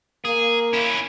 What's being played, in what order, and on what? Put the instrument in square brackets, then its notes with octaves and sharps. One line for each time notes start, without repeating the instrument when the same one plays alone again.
[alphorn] A#3 [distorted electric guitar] G#4
[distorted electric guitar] C#4 E4